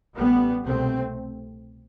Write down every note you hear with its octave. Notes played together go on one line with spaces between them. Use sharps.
A1 A2 G3 B3
C2 B2 A3 C4